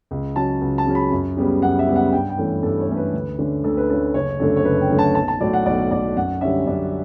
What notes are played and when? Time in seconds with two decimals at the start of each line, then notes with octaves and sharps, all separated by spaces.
0.11 C#2
0.36 C#3 F#3 C#4 A5
0.62 C#2
0.78 A5
0.87 C#3 F#3 C#4
0.95 B5
1.12 F#2
1.37 C#3 G3 B3
1.62 F#2 F#5
1.79 E5
1.87 C#3 G3 B3
1.96 F#5
2.13 G2 G5
2.30 G5
2.38 E3 A3 C#4
2.63 G2 A4
2.80 C#5
2.88 E3 A3 C#4
2.97 B4
3.14 D2
3.39 D3 A3 C#4
3.64 D2 A4
3.77 B4
3.89 D3 A3 C#4 A4
4.14 F#1 C#5
4.40 F#2 D3 A3 A4
4.57 C#5
4.65 F#1 B4
4.82 G5
4.90 F#2 D3 A3
4.99 A5
5.15 B1 A5
5.28 A5
5.40 A2 F#3 D5
5.53 F#5
5.66 B1 D5
5.91 A2 F#3 D5
6.16 F#2 F#5
6.41 D3 G3 C#4 E5
6.66 F#2 D5